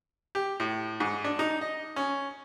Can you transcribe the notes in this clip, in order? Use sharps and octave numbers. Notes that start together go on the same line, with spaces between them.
G4
A2
G#2
D4
D#4
D#5
C#4